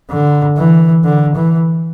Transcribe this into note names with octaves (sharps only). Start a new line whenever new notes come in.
D3
E3
D3
E3